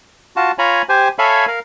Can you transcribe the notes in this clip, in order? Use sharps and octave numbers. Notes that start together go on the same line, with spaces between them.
F4 F#4 A5
F4 C#5 G#5 A#5 B5
G4 C5 G#5
A4 C#5 E5 F5 G#5 B5
A#4 F5